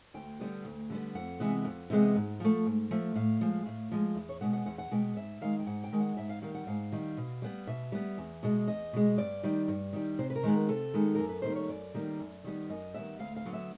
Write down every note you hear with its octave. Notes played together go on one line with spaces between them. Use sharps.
D2 G5
D3 G3 B3
D2
D3 G3 B3
F2 F#5
C3 E3 G#3 B3
F2
C3 E3 G#3 B3
G#2
F3 A3
G#2
F3 A3
A2 F5
F3 G#3
A2
F3 G#3
E2
C#5
B2 G#3 B3 F#5
F#5
E2 F#5
F#5
B2 G#3 B3 G5
G#2 E5
D#3 G#3 F5
G5
G#2 F#5
G5
D#3 G#3
F#5
G#2 E5
F5
D#3 G3 F5
F#5
G#2 F5
D#3 G3
B2
G3 B3
B2 E5
G3 B3
E2
B2 G#3
E2 D#5
B2 G#3
G2 D5
D#3 G3
G2
D#3 G3
C3 C5
B4
A#4
D#3 G#3 B3
C3 A4
D#3 G#3 B3
F#2 A#4
B4
D#3 G3 A#3 C5
C#5
F#2 D5
D#3 G3 A#3
F#2
D#3 G3 B3
F#2 D#5
D#3 G3 B3 E5
D2 F5
F5
D3 F#3 B3
E5